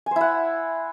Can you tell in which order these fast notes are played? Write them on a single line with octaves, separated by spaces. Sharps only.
G#5 C5 E4 F#5